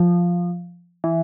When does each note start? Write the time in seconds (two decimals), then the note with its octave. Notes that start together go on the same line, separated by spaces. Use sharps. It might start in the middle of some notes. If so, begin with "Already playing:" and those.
Already playing: F3
1.04 E3